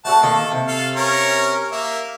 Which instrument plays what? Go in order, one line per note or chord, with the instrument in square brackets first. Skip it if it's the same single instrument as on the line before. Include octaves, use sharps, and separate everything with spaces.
[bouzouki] A3 F#4 A4 [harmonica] F#5 A5
[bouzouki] D#3 A#3 F5 [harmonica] A4
[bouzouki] C3
[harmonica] A4 F5
C#4 A#4 C#5
A#3 E5